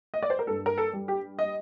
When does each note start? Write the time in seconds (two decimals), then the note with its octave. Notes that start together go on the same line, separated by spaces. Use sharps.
0.14 D#5
0.23 D5
0.30 C5
0.39 A#4
0.47 G2 A4
0.66 A#4
0.78 A4
0.93 G3
1.08 G4
1.39 D#5